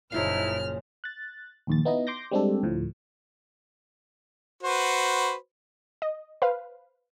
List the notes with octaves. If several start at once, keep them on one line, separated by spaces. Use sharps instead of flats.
F#1 A#2 C#3 F3 D#4 E4 F5 F6
F#6 A6
A#1 D#2 A6
B3 D#4 E4 D#5
C6 D6 G6 A#6
G3 G#3 C4 D4 G4 A4
D2 A2 F3
F#4 B4 C5
D#5
B4 C5 F5